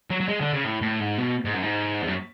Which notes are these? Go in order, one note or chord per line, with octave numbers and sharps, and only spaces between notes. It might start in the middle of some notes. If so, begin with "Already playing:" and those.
F#3
F#3
G#3
D3
C#3
A2
A2
G#2
B2
G#2
F#2
G#2
E2
F#2